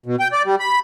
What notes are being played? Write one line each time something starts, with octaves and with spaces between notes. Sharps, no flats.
B2
G5
D5
G3
B5